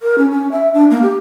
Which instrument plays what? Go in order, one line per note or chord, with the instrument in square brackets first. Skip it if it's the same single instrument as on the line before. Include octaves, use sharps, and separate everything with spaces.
[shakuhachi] A#4
C#4
C#4
E5
D4
A#3
G4